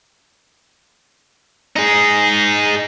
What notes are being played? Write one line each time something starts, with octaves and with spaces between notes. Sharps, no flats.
D#4 G#4